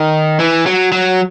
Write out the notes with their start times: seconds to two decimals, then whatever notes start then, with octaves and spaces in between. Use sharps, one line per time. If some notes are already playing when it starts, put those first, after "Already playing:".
Already playing: D#3
0.40 E3
0.66 F#3
0.92 F#3